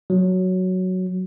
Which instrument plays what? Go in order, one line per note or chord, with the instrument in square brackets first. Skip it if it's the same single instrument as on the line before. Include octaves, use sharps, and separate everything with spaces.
[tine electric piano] F#3